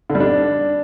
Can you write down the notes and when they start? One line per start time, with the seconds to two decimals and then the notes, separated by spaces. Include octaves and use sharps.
0.10 D3
0.15 G3
0.20 D4